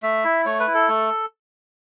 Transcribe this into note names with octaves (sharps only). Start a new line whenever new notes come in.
A3 E5
E4
A3 C#5
B4
E4
A4
A3